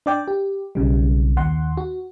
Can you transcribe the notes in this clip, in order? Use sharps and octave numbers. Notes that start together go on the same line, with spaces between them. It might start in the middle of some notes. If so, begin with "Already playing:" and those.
D4 D5 G5
G4
B1 C#3 G3
D#2 F#5 C6
F#4